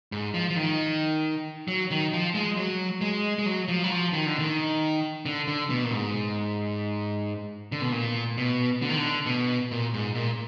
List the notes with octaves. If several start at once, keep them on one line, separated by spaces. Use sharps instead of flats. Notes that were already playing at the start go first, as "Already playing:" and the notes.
G#2
F3
F3
D#3
F#3
D#3
F3
G#3
F#3
G#3
G#3
F#3
F3
F#3
F3
D#3
D3
D#3
D3
D3
B2
A#2
G#2
D3
B2
A#2
B2
D3
D#3
D3
B2
A#2
G#2
A#2